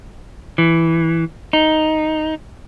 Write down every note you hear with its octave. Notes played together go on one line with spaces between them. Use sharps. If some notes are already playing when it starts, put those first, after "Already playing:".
E3
D#4